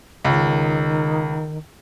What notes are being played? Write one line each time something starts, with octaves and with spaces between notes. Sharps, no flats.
C#2 D#3